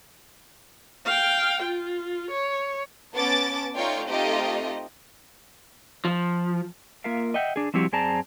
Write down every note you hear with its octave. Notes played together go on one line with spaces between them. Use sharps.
F5 G5
F4
C#5
B3 C#4 A5 D6 A6
A3 D#4 F4 C#5 D5 G5
A3 C4 D#4 F4 G4 D#5
F3
A#3 F4 A#4 E5 F5
D#5 E5 F#5 G5
D4 G#4
F3 G3 C4 E4 F#4 G4
F#2 C4 G#4 D5 A5 A#5